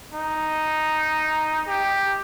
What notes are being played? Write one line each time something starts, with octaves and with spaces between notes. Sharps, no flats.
D#4
G4